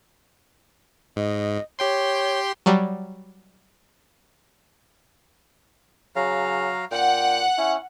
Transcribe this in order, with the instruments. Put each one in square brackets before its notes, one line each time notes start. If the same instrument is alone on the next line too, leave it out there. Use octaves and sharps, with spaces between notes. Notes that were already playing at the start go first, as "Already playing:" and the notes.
[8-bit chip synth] G#2 [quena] D#5
[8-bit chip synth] G4 G5 C6 [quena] C#5
[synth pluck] F#3 G3
[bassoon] C#3 [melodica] F#3 F5 A#5
[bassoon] A#2 [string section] F#5 [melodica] G5
[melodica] C#4 [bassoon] E4